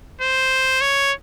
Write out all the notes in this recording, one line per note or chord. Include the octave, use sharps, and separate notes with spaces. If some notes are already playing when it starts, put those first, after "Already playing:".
C5
C#5